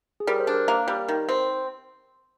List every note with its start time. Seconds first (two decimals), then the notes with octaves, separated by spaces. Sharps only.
0.20 G#4
0.27 G3 A#4
0.40 C5
0.47 D4
0.54 A#4
0.68 A#3
0.88 G3
1.08 D#3
1.29 C4